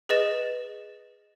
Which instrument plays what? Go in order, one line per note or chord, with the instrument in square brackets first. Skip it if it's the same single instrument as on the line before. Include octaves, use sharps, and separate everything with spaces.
[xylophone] G#4 B4 D#5 A6 E7